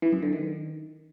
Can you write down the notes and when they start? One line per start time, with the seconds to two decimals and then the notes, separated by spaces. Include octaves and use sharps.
0.02 E3
0.13 F#2
0.23 D3
0.33 D#3